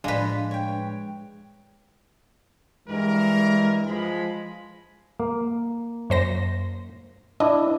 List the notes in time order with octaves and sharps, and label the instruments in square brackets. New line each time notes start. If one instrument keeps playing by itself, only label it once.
[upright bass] A2 F3 [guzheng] G#3 B4 [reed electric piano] D4 [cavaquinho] F4
[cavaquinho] C#5 G5
[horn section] G2 E3 A#4 [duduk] G#3
[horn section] F3 G#3 B5
[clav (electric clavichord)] A#3
[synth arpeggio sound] F#2 C5 A#6
[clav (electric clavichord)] D4 E4 [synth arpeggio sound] D#5